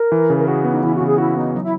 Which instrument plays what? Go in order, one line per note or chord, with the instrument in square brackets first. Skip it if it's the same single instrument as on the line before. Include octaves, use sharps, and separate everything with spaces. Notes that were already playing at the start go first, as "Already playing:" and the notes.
Already playing: [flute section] A#4
[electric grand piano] E3
[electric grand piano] C#3 [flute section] B4
[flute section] A#4
[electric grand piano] F#4 [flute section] G#4
[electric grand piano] B3
[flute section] D#4
[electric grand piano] E3 [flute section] E4
[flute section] F#4
[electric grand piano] C#3
[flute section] G#4
[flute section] E4 [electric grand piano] F#4
[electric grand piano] B3 [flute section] D#4
[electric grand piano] F#3 [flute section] D#4
[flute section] E4